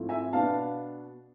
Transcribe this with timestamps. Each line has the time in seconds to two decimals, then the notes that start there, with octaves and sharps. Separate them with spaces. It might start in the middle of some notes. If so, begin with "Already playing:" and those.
Already playing: G#2 F3 A3 C4 E4
0.09 E5 G#5
0.33 B2 B3 D4 F5 A5